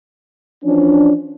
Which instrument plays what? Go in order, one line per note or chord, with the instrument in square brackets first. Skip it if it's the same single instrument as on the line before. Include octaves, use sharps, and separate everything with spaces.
[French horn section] E3 F3 C#4 D4